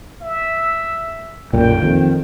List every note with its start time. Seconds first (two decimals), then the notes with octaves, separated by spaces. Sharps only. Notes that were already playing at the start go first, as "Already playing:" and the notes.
0.22 E5
1.53 B1 F#2 A#2 G5
1.82 F2 D#3